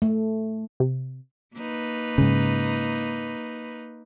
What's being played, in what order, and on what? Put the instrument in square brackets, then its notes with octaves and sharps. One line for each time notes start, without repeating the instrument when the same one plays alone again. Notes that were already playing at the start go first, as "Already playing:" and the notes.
[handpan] A3
[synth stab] C3
[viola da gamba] A#3 D#4 B4
[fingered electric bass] G#2 C#3